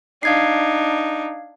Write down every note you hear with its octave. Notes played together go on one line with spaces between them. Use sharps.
D4 D#4 F5 G#6 C7